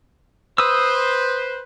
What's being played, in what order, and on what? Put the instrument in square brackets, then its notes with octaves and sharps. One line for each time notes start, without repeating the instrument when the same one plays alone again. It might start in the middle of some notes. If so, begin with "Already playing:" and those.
[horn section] B4 C5 [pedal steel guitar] D#6 E6